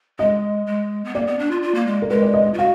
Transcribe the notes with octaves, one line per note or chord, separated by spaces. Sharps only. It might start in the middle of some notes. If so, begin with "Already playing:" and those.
G#3 D#5
G#3
B3
A#3 D5
B3
D4
F4
F4
A#3
G#3
A#4
G#3 B4
D5
D#5
D#5
F4
F#4 F5